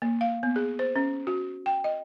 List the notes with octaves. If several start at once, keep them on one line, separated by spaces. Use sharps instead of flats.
A#3
F5
B3
G#4
C5
C#4
F#4
G5
D#5